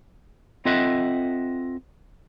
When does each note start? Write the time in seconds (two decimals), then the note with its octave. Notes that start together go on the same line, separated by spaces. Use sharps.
0.65 C4 F4 A4 D#5 E5 F#5